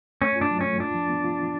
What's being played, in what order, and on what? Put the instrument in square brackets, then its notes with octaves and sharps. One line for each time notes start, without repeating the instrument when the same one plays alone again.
[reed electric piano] A3 [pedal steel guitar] C#4
[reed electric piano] F4
[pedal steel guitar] D4
[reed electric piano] F#3
[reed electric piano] A3 [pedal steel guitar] C#4
[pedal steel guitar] D4 [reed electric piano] F4
[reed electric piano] F3
B3
F4